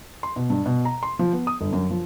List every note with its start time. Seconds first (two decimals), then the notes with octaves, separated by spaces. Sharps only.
0.23 C6
0.36 B2
0.50 G2
0.66 B2
0.85 A#5
1.03 C6
1.19 F3
1.33 B3
1.47 D#6
1.61 G1
1.73 F#2
1.90 F3